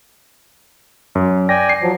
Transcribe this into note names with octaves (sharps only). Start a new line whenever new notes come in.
F#2
D5 G5 G#5 A#6
C7
F3 F#3